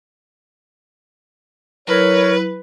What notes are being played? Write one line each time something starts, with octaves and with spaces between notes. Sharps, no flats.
F#3 E4 A#4 B4 C#5